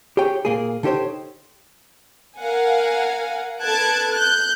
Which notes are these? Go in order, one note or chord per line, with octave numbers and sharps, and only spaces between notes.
G4 G#4 C#5 G5
A#2 A#3 G#4
D3 D#4 G4 C5 C#5
A#4 F5 F#5 G#5
A4 B4 A5 F#6 G#6 D7
F#6 G6